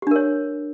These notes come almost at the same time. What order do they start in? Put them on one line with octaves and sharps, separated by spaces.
G4 D4 A#4 C#5